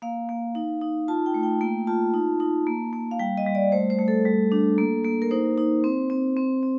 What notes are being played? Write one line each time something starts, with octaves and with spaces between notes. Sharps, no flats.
A#3 F5
A#3
D#4
D#4
F4 A5
G5
A3
G5
A#3 G5
F4 A5
D#4
D#4
A#3
A#3
F5
G3 G5
D#5
G3
D5
A3 C5
C5
A3
A4
G3
D4
A#3
A#3
A#4
D#4 C5
D#4
C4
C4
C4
C4